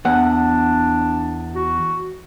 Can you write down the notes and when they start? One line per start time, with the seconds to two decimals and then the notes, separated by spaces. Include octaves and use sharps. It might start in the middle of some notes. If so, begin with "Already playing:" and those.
0.05 E2 D4 F#5
1.55 F#4